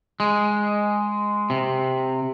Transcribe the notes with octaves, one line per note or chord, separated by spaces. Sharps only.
G#3
C3